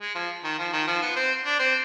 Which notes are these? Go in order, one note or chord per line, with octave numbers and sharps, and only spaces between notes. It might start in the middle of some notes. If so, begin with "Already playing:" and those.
G#3
F3
D#3
F3
D#3
F3
B3
C4
D4
C4